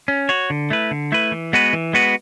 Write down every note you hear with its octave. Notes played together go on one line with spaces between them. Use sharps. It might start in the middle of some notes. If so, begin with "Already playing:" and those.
C#4
F#4 C#5
D3
A3 E4 B4
D3
A3 E4 B4
E3
G#3 B3 F#4 B4
E3
G#3 B3 F#4 B4